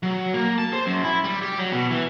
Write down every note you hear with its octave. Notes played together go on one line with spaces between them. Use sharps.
F#3
A#3
A5
C5
F#2
E4
G3
G4
F#3
B2
E3